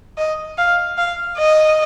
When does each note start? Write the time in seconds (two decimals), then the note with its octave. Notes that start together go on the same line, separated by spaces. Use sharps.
0.18 D#5
0.58 F5
0.97 F5
1.37 D#5